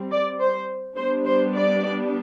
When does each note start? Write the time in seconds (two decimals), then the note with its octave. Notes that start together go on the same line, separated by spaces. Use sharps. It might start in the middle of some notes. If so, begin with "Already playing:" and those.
Already playing: G3 C4
0.11 D5
0.40 C5
0.97 G3 B3 D4 C5
1.26 C5
1.55 D5